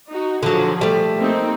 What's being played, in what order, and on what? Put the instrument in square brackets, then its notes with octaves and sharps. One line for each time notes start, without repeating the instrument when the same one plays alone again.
[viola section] D#4 F#4
[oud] D3 F#3 [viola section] F3 G#4
[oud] G3 A3
[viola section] A#3 C4 D#4